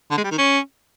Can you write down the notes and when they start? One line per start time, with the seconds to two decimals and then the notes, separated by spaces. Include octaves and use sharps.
0.11 D3
0.18 G#3
0.24 G3
0.31 D#3
0.38 C#4